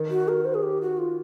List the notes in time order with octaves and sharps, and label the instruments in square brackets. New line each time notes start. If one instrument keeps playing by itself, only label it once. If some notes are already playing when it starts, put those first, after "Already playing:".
Already playing: [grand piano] D#3
[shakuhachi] F#4
A#4
C5
G#4
G4
F#4
F4